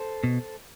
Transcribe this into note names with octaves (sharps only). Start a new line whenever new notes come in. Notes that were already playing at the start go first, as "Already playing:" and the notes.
Already playing: A4 C5
B2